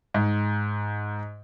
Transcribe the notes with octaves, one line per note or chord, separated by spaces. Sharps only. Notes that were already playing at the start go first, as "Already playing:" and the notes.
G#2